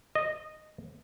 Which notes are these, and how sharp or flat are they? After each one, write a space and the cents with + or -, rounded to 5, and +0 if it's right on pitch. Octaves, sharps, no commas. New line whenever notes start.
D#5 -10